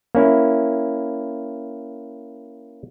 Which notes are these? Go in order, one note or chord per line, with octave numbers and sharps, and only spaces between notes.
A#3 C#4 E4